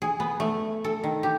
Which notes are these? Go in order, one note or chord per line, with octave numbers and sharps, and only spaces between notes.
G#4
B3
A3
A4
D#3
G4